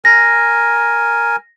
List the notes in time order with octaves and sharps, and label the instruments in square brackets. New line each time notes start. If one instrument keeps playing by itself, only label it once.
[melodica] A#4 G#5 [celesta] A#6